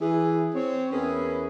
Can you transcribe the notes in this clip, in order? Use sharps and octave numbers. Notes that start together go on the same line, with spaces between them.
E3 G#4
C4 C#5
E2 C#4 E4 G#4 A#4 B4